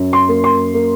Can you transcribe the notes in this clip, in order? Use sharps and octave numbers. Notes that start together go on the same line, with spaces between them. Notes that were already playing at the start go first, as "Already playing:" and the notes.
Already playing: F#2
C6
A#3
C6
A#3